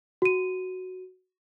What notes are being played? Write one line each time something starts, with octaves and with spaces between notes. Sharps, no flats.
F#4 D#7